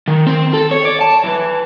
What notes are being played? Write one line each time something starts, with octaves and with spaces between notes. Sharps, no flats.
D#3
C4
A4
C#5
D5
A5
E3